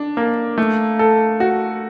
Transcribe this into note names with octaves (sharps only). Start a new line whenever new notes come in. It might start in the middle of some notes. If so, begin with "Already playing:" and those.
Already playing: D4
A#3
A3
A4
F#4